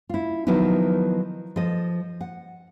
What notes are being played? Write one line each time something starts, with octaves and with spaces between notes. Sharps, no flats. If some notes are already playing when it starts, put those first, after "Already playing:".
E4 F4
D#3 F3 F#3 B3 D#4 E4
F3 A4 D#5
F#5